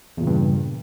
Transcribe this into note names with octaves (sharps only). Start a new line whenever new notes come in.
E2 G2 A#2 C#3